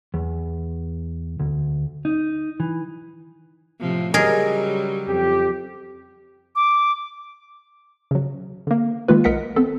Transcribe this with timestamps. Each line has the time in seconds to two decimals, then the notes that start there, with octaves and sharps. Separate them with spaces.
0.14 E2
1.40 D2
2.05 D#4
2.60 E3
3.80 A2 C3 F3
4.14 C#3 F#3 G3 G#4 A#4 D#5
5.07 F2 G4
6.55 D6
8.11 C#3 F#3
8.67 D3 A#3
9.08 D#3 G#3 A#3 F4 B4
9.24 B1 A#4 D#5 F#5 B6 C#7
9.56 B3 C4 A4